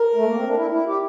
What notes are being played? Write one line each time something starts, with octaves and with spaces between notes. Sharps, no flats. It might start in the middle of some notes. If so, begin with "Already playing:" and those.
Already playing: A#4
A3
A#3
C4
D4
E4
E4
G4